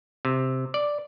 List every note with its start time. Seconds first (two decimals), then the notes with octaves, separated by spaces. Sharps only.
0.25 C3
0.74 D5